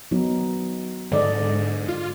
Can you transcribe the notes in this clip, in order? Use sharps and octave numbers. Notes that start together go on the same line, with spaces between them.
F#3 B3 D#4
G#2 D3 D5 D#5
F4